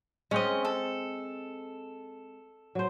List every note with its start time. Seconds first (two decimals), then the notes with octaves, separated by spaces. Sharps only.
0.31 G#3 C4 C#4 D#5
0.65 A4
2.75 F#3 C5